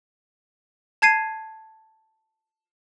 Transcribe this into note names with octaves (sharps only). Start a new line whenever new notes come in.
A5 G#6 C7 D#7